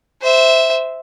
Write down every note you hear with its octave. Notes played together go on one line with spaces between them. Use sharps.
C5 E5